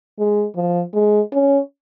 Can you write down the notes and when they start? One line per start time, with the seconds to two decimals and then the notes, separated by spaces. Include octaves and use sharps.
0.19 G#3
0.56 F3
0.94 G#3
1.32 C#4